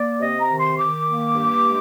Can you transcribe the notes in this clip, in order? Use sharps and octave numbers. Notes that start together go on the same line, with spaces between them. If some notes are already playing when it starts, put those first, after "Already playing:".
Already playing: A#3 D5
C3 D#5
A#5
D#3
C6
D#3 D6
A#3
G2
G#3